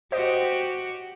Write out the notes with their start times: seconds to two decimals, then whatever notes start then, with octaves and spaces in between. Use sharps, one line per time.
0.12 F#4 G4 C5 D#5